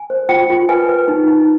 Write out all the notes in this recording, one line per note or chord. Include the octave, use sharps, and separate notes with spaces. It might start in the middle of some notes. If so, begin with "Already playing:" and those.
Already playing: G#5
C5
F4 G5
F4
B4 G#5
B4
D#4
D#4